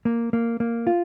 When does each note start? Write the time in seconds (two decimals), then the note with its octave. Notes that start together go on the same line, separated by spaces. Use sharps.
0.05 A#3
0.33 A#3
0.60 A#3
0.87 F4